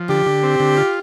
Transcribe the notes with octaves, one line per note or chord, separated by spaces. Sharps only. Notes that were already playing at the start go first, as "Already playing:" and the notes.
Already playing: F3
D3 G4
D3
C4
D3
F4